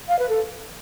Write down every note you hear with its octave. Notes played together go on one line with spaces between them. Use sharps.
F5
B4
A4